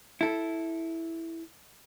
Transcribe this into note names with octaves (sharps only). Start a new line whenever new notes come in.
E4 A4